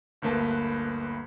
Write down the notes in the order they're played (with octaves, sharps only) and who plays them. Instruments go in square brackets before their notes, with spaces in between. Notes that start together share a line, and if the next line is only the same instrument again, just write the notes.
[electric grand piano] G1 D2 A#3 B4 A5